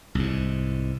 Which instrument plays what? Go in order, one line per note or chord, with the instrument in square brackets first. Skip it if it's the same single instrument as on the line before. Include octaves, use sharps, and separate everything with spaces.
[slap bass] C2 G#2